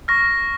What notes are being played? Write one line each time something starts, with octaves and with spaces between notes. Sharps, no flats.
C#6 F6 A#6